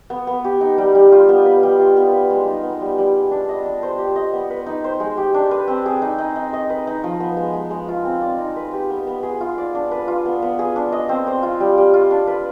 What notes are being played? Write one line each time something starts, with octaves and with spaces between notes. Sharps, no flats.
B3
B3
G4
D#4
G3
G3
F4
B3
B4
G3
F4
B3
B4
G#3
D#4
B3
G3
G3
G#4
D4
D#5
D4
C5
G4
D#5
B3
B4
D#4
C5
G#3
G4
D4
B4
C4
G#4
D#4
D#4
D#4
D#5
B4
D#4
F3
B3
G#3
G#3
G#3
F4
C4
D5
D#4
B4
G4
B3
B3
G#4
F4
D5
D4
B4
F4
B3
B3
G#4
D4
D#5
C4
C5
F4
G3
G3
F4
D4
B4